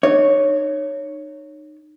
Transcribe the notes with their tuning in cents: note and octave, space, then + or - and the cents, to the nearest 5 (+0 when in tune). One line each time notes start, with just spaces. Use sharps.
D#4 -30 C#5 +0